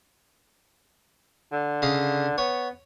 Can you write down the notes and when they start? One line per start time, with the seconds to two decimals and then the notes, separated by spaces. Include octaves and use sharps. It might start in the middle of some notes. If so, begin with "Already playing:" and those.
1.52 D3
1.82 C#3 D#5 F5
2.38 B3 C#5